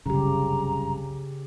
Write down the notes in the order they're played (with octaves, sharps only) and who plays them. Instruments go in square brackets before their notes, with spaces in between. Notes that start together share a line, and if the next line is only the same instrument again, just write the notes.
[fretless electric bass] G1 C2 F#2 [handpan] C#3 G4 [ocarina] A#5